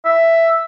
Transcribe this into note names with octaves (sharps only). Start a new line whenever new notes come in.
E5